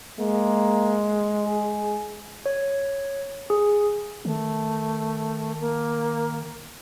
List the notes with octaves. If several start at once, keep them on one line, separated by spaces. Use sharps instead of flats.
G#3 A#3
G#4
C#5
G#4
D#3 A3
A#3